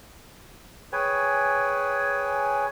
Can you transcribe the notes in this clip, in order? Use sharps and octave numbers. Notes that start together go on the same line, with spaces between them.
G#4 B4 C#5 G5 G#5